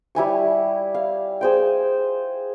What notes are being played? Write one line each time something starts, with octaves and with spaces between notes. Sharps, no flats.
G3 E4 G#5 C#6
F5
G#4 C5 G5